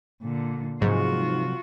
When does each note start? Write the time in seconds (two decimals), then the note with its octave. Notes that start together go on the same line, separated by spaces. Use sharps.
0.22 A#2 D3
0.81 G#2 C3 F3 F#3 F4 F#4